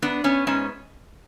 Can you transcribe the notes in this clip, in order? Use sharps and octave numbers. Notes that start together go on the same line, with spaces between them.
B3 D4
B3 C#4
G#2 C#4